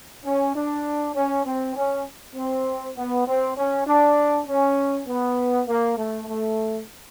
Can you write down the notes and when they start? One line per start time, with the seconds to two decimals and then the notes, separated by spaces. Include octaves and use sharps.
0.25 C#4
0.55 D4
1.15 C#4
1.45 C4
1.76 C#4
2.35 C4
2.96 B3
3.26 C4
3.57 C#4
3.87 D4
4.47 C#4
5.07 B3
5.68 A#3
5.98 A3
6.28 A3